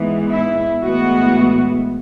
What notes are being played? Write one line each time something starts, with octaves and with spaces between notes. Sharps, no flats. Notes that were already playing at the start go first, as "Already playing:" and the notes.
Already playing: G#2 E3 G#3 B3
E4
A2 E3 G#3 B3 F#4